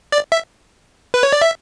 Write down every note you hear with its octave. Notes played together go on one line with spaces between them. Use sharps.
D5
E5
B4
C#5
D5
E5